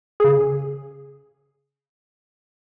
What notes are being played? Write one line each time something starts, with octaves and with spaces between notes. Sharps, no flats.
C#3 G#4